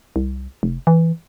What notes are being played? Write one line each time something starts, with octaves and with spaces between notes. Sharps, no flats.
C2
F1
E3